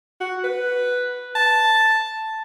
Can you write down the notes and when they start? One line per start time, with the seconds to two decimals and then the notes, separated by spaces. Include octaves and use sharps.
0.21 F#4
0.44 B4
1.35 A5